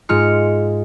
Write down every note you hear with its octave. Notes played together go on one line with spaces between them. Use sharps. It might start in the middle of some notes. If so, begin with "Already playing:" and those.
G#2 G#3 F4 F6 C#7